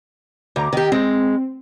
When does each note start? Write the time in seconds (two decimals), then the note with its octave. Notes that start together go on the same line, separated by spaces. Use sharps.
0.56 D2 A#5 D6
0.73 D#3 G4
0.92 G#3 C4